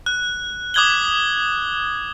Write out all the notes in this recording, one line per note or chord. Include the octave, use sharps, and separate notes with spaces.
F#6
D6 D#6 F#6 G#6 F#7 G7